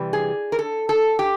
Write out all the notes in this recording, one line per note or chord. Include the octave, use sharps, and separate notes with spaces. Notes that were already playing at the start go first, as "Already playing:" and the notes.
Already playing: C3 E3 G3
G#4
A#4
A4
A4
G4